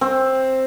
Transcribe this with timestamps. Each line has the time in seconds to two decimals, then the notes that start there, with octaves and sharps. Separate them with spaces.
0.01 C4